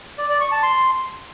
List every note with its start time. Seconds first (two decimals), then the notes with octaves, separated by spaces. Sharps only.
0.18 D5
0.29 D5
0.40 C#6
0.52 A5
0.63 C6